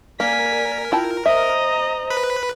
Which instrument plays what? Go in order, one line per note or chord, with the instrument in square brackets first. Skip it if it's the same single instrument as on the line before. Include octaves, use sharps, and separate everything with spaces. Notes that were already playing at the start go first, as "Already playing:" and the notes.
[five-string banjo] A#3 [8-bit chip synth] A#4 [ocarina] D5 [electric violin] G#5 B6
[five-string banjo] E4 G5 A5 [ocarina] F4
[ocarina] C5 [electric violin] D#5 A#5 [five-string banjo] E5
[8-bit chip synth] B4 B5